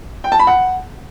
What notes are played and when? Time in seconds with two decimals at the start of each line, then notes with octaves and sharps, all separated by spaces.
0.24 G5
0.32 A5
0.39 B5
0.47 F#5